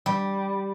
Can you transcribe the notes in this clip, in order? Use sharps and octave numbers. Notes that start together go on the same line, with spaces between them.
G3